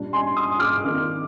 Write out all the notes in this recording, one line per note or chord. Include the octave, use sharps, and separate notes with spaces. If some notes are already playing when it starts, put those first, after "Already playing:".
Already playing: A#2 G3 D4
G#5 C6
C6 D#6
D6 F6
F2 D#3 A#3 D4